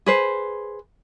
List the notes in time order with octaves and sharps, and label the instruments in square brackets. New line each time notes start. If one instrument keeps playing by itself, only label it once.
[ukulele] G#4 B4 C5